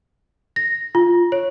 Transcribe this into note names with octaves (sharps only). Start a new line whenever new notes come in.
A#6
F4
C#5